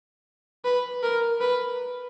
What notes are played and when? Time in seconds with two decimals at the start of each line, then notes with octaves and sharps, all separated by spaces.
0.65 B4
1.03 A#4
1.41 B4